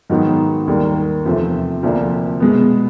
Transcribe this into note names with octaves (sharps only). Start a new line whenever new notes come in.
G#2 D#3 F#3 B3 D#4
D#2 D#3 G3 A#3
E2 C3 F3 A3 C4
D2 C3 F3 A#3 D4
B2 G#3 B3